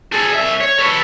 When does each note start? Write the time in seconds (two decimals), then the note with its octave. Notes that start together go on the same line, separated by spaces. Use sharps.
0.12 G#4 A4
0.33 C2 E5
0.61 C#5
0.79 A4 B4